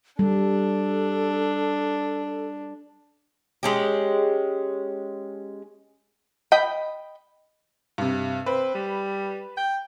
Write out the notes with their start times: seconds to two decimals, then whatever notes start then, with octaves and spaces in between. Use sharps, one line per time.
0.19 G3 D4 A4
3.63 G#3 C#4 G4
6.52 D#5 G5 B5
7.98 G2 C3
8.46 C4 B4
8.74 G3
9.57 G5